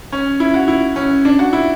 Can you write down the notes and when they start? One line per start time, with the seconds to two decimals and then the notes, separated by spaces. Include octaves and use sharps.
0.12 C#4
0.40 E4
0.54 F#4
0.68 E4
0.96 C#4
1.25 D4
1.39 F#4
1.53 E4